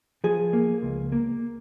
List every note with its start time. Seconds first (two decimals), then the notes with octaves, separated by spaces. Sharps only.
0.24 F3 G#4
0.53 A#3
0.83 C#2
1.12 A#3